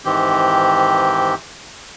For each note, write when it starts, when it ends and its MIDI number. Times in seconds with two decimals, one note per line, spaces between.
0.05 1.34 44
0.05 1.34 51
0.05 1.34 52
0.05 1.34 60
0.05 1.34 67
0.05 1.34 91